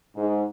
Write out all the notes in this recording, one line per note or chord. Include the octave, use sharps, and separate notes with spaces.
G#2